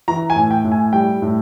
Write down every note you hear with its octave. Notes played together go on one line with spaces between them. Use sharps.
E3 A#5
G#5
A2
G5
A2
G#5
G3 G5
A2